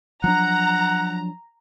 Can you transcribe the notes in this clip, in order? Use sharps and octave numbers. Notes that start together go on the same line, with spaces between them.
F3 F#3 D4 F#5 A#5